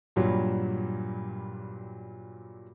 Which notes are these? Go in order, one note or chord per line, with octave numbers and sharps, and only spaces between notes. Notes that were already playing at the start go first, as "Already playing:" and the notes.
G2 A#2 F#3 G3